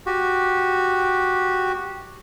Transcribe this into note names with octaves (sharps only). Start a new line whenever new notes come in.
F#4 G4